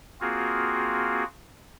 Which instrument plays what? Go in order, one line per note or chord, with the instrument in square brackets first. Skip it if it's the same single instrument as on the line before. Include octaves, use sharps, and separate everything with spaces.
[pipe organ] A#3 C4 F4 F#4 G#4